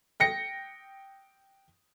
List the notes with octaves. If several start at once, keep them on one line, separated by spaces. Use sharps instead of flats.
G5 A#6 C#7